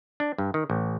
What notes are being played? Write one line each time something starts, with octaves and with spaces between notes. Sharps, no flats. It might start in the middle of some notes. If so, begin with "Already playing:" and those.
D4
G2
D#3
A1